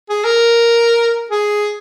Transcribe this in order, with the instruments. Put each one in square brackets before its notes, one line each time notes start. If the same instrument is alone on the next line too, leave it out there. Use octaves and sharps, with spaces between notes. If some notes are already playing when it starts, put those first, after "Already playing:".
[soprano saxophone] G#4
A#4
G#4